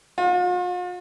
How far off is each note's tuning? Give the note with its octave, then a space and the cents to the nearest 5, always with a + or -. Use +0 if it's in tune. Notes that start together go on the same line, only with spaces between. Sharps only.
F4 +45